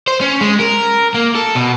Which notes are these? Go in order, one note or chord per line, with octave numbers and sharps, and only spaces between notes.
C5
C#4
G#3
A#4
A#3
A4
B2